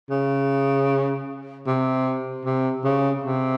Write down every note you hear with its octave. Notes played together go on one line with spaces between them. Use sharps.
C#3
C3
C3
C#3
C3